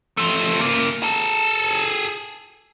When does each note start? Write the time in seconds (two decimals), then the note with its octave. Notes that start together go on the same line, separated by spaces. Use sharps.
0.17 F3 A3
0.59 C#3 A#3
1.03 G#4 A4